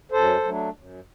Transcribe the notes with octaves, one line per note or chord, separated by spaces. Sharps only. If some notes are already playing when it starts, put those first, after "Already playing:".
F#2 A4 C5
F#3 A3 D4
F#2